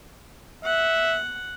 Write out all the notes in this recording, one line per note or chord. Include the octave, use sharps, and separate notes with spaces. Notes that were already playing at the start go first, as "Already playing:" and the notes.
E5 F#5